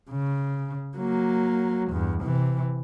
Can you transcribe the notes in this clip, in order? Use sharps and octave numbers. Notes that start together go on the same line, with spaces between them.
C#3
F#3 A#3
E2 G2
C3 E3